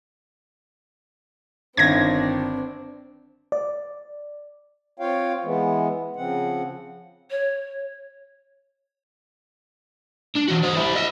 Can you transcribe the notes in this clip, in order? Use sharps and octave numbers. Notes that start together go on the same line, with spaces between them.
G1 D#3 C4 D4 G#6 A#6
D5
C4 F4 C#5 F5 G5
E3 G#3 B3
C#3 F3 C4 F#5
C#5
D4
E3 F#4
C5 D#5
E4 G4
D#5 E5